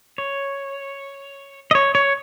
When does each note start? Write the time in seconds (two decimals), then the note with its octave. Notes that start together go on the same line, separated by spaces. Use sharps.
0.18 C#5
1.71 D#5
1.75 C#5
1.95 C#5